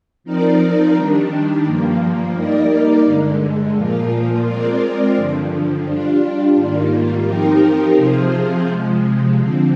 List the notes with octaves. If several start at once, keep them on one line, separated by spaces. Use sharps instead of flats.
F3 C4 D#4 A#4 D5
D#3 G3 D4
G2 F3 A#3
G3 A#3 D#4 A#4 D5
G2 D3 G#3
A#2 F3 A#3 F4
G#3 C4 F4 A#4 D5
G2 D3 F3
G3 D4 F4
G#2 D#3 G3 A#3 F4
F3 C4 D#4 G4 A#4
C3 F3 C4 F4 G#4
C3 F3 G#3
D3 F3 C4